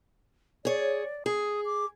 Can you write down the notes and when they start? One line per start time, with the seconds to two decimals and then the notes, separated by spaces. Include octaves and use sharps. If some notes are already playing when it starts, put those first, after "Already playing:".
0.65 G#4 C#5 D5
1.26 G#4 D#6
1.65 D6